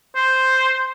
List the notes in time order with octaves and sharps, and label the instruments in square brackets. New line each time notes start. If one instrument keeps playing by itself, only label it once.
[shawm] C5